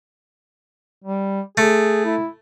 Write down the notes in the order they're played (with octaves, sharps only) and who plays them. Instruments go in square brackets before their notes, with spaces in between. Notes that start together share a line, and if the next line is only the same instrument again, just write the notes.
[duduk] G3
[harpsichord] A3 [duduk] G#4
[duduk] E4